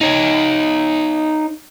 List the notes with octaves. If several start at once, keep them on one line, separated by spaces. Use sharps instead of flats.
D#4 C#5